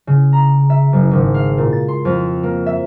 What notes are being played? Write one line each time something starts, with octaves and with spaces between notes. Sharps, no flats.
C#3
A#5
E5
F#1
G#1
F5
A#2
A6
C6
F2
A#3
E5